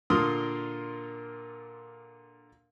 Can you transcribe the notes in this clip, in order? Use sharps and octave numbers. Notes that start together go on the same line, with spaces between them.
A#2 D3 F4 A#4 C6 D#6